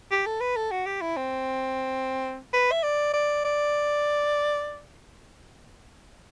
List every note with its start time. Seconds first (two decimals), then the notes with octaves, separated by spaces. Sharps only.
0.11 G4
0.26 A4
0.41 B4
0.56 A4
0.71 F#4
0.86 G4
1.01 E4
1.17 C4
2.53 B4
2.72 E5
2.83 D5
3.14 D5
3.45 D5